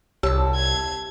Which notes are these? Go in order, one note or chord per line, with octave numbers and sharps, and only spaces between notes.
C2 G4 A5 E6
G#6